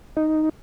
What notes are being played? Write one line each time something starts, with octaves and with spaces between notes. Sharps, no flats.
D#4